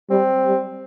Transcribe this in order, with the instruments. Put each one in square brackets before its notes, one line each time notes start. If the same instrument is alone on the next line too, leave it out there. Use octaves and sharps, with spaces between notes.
[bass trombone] G3 [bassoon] C4
[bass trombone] G3